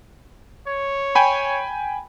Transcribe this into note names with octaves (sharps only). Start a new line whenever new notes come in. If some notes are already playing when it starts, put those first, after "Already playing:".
C#5
G5 G#5 B5